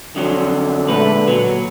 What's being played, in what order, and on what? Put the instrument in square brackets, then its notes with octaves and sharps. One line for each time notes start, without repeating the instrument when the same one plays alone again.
[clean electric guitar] F2 F#3 [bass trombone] D3
[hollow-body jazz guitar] A#2 G#3 A3 [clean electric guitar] B4
[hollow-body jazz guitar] A#2 [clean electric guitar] F#3